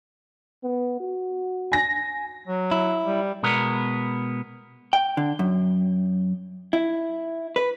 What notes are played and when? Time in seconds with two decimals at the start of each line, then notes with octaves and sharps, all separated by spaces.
0.63 B3
1.00 F#4
1.72 G#5 A#6
2.47 F#3
2.72 E4
3.05 G3
3.43 B2 G#3 B3 A#4
4.93 G5
5.17 D3
5.39 F#2
6.73 E4
7.56 B4